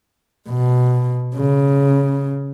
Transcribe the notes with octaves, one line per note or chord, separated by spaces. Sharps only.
B2
C#3